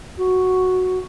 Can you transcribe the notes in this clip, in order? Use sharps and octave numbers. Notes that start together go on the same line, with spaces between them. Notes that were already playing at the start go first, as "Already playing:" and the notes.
F#4